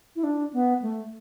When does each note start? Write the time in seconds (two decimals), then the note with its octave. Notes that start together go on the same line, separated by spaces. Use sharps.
0.16 E4
0.24 D4
0.53 B3
0.82 A3